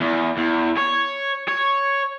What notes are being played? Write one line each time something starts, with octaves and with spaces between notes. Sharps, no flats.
E2
E2
C#5
C#5